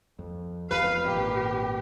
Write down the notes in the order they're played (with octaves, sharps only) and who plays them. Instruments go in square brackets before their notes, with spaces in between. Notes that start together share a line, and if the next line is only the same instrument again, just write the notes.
[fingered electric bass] F2
[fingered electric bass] E1 F2 [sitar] B4 [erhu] F5
[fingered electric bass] G#1 A#2 [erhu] G4